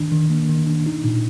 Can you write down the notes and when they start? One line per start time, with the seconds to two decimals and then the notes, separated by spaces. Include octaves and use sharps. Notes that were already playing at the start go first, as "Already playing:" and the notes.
Already playing: D#3 D4
0.12 D#3
0.30 A#3
0.49 D#3
0.67 D4
0.86 D#4
1.04 A#2